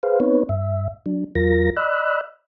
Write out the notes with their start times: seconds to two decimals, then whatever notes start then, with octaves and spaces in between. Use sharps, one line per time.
0.03 G#4 B4 C5 F5
0.20 B3 C4 D#4 B4 C#5
0.49 G2 E5
1.06 F#3 D4
1.35 E2 F#3 F4 A#4 A#6
1.76 D5 D#5 B5 E6 F#6